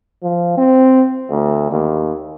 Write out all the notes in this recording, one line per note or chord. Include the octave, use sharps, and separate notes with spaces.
F3
C4
D2
D#2